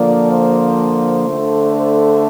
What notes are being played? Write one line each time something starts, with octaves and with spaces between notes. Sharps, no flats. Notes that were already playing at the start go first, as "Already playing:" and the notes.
Already playing: D3 F3 A#3 D5
C5
D3 A3 D4
C5